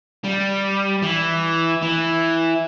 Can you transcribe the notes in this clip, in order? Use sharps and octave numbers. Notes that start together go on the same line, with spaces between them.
G3
E3
E3